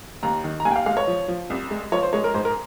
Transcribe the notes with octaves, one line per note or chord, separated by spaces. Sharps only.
D#2 A#5
D#3
A#5
D#2 G#5
G5
F5
G#3 F5
C#5
F3
F3
C2
G#3
F3 C#5
C5
G#3 C#5
A#4
G#2 C5
A#4